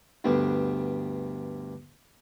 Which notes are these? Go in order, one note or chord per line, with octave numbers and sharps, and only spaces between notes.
D2 G2 B3